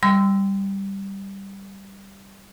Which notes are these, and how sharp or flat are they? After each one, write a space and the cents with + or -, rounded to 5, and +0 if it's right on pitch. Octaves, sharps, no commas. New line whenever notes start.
G3 +0 C6 -25 E6 +0